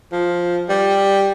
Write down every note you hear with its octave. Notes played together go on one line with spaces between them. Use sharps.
F3
G3